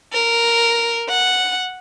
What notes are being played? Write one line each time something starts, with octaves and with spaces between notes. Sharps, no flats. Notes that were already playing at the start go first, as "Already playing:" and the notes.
A#4
F#5